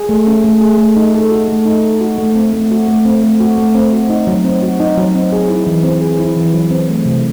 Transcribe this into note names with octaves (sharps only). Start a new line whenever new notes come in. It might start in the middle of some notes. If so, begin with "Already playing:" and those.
Already playing: G#4
A3
C#4
A3
G#4
A3
D#4
A4
F#4
A3
D#4
A4
F#4
A3
C4
A3
F#4
A3
C4
A3
F#4
A3
C4
F#4
D#4
F#3
C4
F#4
D#4
F#3
C4
G#4
E4
E3
C4
G#4
E4
E3
F#3
C4
A3
C3